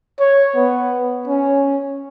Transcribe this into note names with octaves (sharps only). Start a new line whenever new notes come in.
C#5
B3
C#4